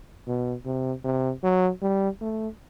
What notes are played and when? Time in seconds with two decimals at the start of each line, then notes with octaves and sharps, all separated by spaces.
0.27 B2
0.65 C3
1.04 C3
1.43 F#3
1.82 G3
2.21 A3